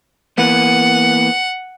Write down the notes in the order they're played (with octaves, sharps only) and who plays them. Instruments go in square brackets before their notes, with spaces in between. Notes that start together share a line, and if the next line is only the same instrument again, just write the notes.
[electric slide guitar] E3 A#3 B3 [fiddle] F#5